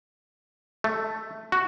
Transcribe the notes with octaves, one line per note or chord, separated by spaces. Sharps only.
A3
F#4